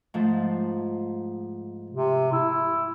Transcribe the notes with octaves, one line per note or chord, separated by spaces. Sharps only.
G#2 F3 A3
C3
E4